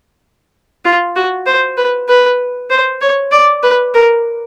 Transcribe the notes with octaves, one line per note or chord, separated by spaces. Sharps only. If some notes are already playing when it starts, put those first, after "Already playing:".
F4
F#4
C5
B4
B4
C5
C#5
D5
B4
A#4